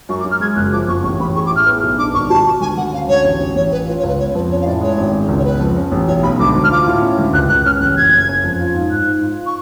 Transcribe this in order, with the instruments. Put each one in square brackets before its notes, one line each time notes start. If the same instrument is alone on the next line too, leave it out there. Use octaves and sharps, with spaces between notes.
[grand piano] F#2 [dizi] C#6
[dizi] D6
[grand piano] F#2
[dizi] F6
[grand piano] G#3 [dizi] G#6
[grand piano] F#1 [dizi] F#6
[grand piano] F3 [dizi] D6
[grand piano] F#1 [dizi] C#6
[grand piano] A1 [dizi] C#6
[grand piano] A1 [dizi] B5
[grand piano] G#4 [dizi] C#6
[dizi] D6
[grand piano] A2 [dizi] F6
[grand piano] B3
B1
[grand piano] D4 [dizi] D6
[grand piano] G#1 [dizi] C#6
[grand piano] F#4 [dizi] A5
[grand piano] B2
[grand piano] D2 [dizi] G#5
[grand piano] D2 [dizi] F#5
[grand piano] C#4 [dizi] F5
[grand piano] D2 [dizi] C#5
[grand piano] A1
A1
[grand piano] A1 [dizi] C#5
[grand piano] A1 [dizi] B4
[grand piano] F4 [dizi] B4
[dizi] C#5
[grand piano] C#2 [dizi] B4
[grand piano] B3 [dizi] C#5
[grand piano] F2 [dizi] B4
[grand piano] C#4 [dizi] C#5
[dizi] F5
[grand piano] A2 [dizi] D5
[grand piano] G#3 [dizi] C#5
[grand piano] G#1
C#4
C#2
[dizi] C#5
[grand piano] B3 [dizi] B4
[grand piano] F2
C#4
A1
[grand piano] B1 [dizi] C#5
[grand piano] B1 [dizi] B5
[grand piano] D2 [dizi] D6
[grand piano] D2
[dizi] F6
[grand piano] F4 [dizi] D6
[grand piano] A2
C#4
D2
[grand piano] C#2 [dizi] F#6
[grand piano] C#2 [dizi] F#6
[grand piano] C#4 [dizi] F6
[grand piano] A1 [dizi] F#6
[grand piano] F#1 [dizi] G#6
[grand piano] F#1
C#4
F2
F4
G#2
[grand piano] G#2 [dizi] F#6
[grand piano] G#2
F4
[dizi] C#6